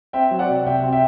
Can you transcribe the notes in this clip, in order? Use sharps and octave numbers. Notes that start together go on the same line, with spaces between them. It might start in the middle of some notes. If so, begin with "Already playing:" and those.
C4 E5 G5
F#3
D5 F#5
C3
C3 E5 G5
C4
E5 G5